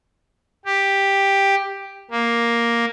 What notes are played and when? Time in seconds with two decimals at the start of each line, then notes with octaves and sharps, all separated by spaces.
0.65 G4
2.11 A#3